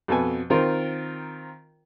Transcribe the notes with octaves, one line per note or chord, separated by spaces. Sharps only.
F2 B2 A4 B4 G#5
D#3 C4 F4 A#4 C5